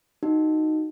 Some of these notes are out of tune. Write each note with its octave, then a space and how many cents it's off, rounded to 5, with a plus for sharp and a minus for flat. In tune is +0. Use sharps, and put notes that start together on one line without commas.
D#4 +0 F#4 +15